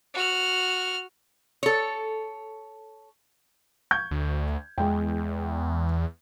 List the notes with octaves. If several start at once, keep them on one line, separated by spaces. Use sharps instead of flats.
F#4 F6
A4 C#5
C#6 G6 G#6
D2
E2 G#3 G5